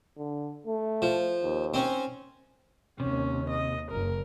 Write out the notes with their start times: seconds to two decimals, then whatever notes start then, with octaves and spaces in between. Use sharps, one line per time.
0.17 D3
0.67 A3
1.02 F3
1.43 D#2
1.74 C4 C#4
3.00 D#2 C3 C#4
3.50 D#5
3.91 F#1 A#4